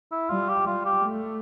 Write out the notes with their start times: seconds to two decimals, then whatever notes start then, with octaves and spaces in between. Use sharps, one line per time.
0.12 E4
0.30 G3 F4
0.49 G4
0.67 G3 F4
0.86 G4
1.05 A3